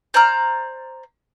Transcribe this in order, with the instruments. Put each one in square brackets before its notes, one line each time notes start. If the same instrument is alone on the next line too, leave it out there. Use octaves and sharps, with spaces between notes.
[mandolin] C5 D5 A#5 F6